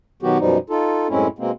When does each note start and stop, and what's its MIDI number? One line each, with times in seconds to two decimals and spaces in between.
0.23 0.38 47
0.23 0.38 51
0.23 0.38 54
0.23 0.38 59
0.23 0.38 66
0.23 0.38 67
0.39 0.58 42
0.39 0.58 47
0.39 0.58 53
0.39 0.58 55
0.39 0.58 63
0.70 1.07 63
0.70 1.07 65
0.70 1.07 69
1.09 1.27 42
1.09 1.27 45
1.09 1.27 56
1.09 1.27 60
1.09 1.27 61
1.09 1.27 64
1.39 1.51 47
1.39 1.51 56
1.39 1.51 58
1.39 1.51 60